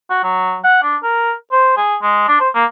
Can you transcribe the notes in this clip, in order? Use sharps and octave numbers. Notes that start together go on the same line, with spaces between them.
F#4
F#3
F#5
D4
A#4
C5
G#4
G#3
D4
C5
A#3